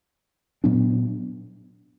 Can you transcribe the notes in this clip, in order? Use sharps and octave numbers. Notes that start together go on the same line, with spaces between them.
A#2 F#3 B3 D4